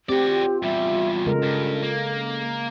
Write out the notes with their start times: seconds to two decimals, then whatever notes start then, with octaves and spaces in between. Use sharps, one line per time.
0.09 C4 F#4 G4 D5
0.22 F4
0.63 E2 G3 E5
1.26 C#3 G#3 A4 A#4
1.42 G2
1.82 A#3